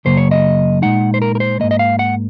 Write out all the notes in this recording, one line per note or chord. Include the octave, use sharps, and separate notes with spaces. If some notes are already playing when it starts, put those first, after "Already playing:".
F#2 C#3 F#3 A#3 C5
C#5
D#5
A#2 G#3 D#4 F#5
C5
A#4
A#4
C5
G#2 D#3 A#3 D#5
D#5
F5
F#5